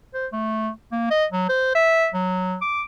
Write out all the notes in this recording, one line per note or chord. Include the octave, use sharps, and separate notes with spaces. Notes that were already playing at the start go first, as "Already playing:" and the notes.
C5
A3
A#3
D#5
F#3
C5
E5
F#3
D6